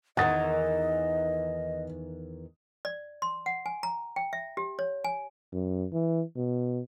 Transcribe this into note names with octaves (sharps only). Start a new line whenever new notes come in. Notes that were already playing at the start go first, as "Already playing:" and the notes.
E2 D#3 E3 D#5 F#5 D#6 A6
D5
C6
F#5
G#5
A#5
G5
E5
G4
C#5
G#5
F#2
E3
B2